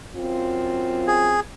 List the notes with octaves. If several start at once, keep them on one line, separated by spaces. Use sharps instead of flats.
F#2 C4 F4
G#4